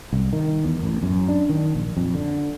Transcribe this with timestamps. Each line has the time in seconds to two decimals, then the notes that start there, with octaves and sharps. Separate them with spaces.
0.13 C2
0.33 D#3
0.65 E2
0.83 A1
1.03 F#2
1.28 D4
1.49 D#3
1.75 A#1
1.97 F2
2.15 D3